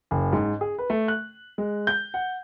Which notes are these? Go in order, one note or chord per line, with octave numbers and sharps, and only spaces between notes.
F#1
G#2
G#4
B4
A3
F#6
G#3
G6
F#5